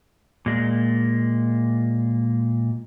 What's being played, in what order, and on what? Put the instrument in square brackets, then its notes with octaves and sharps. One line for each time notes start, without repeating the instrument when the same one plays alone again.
[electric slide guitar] A#2 G#3